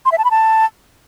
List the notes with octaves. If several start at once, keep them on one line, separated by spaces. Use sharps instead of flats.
C6
E5
A5
B5
A5